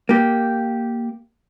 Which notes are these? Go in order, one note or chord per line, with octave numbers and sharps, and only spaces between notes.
A#3 G4